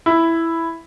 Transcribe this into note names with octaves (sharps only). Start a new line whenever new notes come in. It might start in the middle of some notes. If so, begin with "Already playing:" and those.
E4